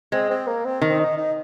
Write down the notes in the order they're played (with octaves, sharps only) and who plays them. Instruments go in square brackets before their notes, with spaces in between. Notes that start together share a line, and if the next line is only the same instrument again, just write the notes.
[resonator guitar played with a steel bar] G#3 [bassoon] C4
[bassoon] C4
A#3
C4
[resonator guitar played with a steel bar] D#3
[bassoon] C4
D#4
D#4